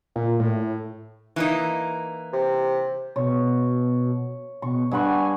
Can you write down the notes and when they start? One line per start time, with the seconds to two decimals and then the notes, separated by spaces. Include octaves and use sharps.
0.16 A#2
0.40 A2
1.36 E3 A#3 D#4
2.33 C3
3.16 B2 C#5
4.62 B2 C#6
4.91 G2 F#5 G#5 C#6